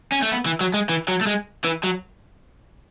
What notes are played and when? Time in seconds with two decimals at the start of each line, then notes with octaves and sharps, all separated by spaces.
0.12 C#4
0.22 A3
0.31 B3
0.46 E3
0.61 F#3
0.74 G#3
0.89 E3
1.08 F#3
1.21 A3
1.27 G#3
1.65 E3
1.84 F#3